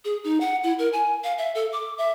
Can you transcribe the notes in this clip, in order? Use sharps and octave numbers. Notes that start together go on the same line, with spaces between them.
G#4
D#4
F#5
E4
A#4
G#5
F5
E5
A4
D6
E5